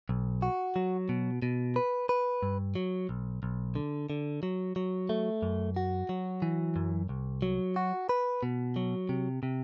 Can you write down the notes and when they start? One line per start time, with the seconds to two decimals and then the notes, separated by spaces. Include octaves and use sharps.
0.09 B1
0.42 F#4
0.76 F#3
1.09 B2
1.42 B2
1.76 B4
2.09 B4
2.43 G2
2.75 F#3
3.09 B1
3.43 B1
3.75 D3
4.10 D3
4.43 F#3
4.76 F#3
5.09 A3
5.42 F#2
5.76 F#4
6.09 F#3
6.42 E3
6.76 F#2
7.09 C2
7.42 F#3
7.76 F#4
8.09 B4
8.43 B2
8.76 F#3
9.09 C3
9.43 C3